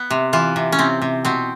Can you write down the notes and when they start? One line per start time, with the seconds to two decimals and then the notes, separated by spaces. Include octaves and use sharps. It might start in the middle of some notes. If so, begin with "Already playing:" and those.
Already playing: B3
0.10 C3
0.33 E3 F4
0.56 C3
0.72 C#4
0.79 C3 C4
1.02 C3
1.25 B2 C4